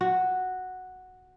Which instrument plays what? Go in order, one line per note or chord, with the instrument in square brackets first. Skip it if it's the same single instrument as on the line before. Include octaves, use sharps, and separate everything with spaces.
[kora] F#4